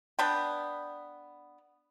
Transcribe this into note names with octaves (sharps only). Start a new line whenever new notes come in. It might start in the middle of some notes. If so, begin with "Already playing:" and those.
B3 D4 B4 G5